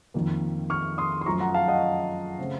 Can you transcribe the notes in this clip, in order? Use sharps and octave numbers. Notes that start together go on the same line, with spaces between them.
F2 D#3 A#3
C#6 F6
C6 D#6
C6
F#2 F3 A3 A#5 C#6
F#5 A#5
F5 A5
D#5 F#5
C#3 A3 C4